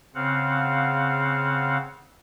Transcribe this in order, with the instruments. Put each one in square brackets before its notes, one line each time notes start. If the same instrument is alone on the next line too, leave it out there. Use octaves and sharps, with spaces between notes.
[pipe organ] C#3 C4 F5 F#5